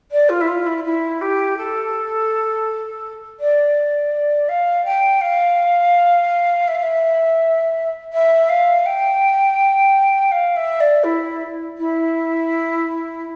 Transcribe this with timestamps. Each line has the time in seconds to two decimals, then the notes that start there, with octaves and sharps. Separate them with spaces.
0.11 D5
0.29 F4
0.41 E4
0.47 F4
0.66 E4
0.84 E4
1.21 G4
1.57 A4
3.40 D5
4.48 F5
4.85 G5
5.21 F5
6.67 E5
6.74 F5
6.82 E5
8.13 E5
8.49 F5
8.86 G5
10.31 F5
10.56 E5
10.80 D5
11.03 E4
11.77 E4